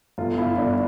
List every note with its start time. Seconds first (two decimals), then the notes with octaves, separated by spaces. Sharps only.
0.18 G1 F4
0.37 G1 E4
0.57 G1 D4